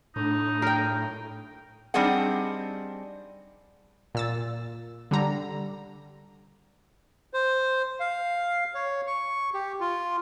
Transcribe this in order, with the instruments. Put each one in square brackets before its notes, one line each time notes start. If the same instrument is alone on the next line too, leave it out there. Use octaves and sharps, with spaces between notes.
[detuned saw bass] A2 [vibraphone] D4 [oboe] D#4
[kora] A#4 G5
[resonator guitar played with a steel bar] G3 C4 D4 D#4 G#4 F#5
[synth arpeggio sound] A#2 E6 A6
D3 G3 A#5
[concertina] C5
F5
C#5
C#6
G4
F4